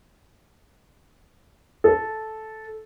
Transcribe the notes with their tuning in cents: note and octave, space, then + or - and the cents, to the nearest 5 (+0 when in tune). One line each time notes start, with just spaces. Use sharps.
A4 -10